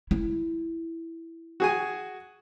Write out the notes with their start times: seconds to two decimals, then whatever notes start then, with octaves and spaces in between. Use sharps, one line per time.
0.11 E4
1.60 F#4 G#4 G#5